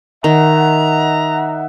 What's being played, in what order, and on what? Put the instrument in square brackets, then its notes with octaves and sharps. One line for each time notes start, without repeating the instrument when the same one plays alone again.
[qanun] D#3 [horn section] D#5 E5 F#5 [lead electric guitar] A#5